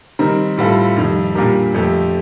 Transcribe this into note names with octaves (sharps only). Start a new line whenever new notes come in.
D#3 G3 C4 D#4 A#4
A2 G3 C4 F4 A4
F2 D#3 G3
A#2 G3 D4 G4 A#4
F2 D3 A3 C4 G4